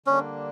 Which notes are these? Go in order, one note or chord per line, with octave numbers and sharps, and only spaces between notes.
D3 G3 A#3 C#4 D4